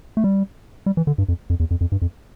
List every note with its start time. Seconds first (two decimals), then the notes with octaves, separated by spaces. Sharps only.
0.17 A3
0.24 G3
0.86 G3
0.97 E3
1.07 D3
1.18 G2
1.28 F2
1.50 F2
1.60 E2
1.71 F2
1.81 F2
1.92 G2
2.02 F2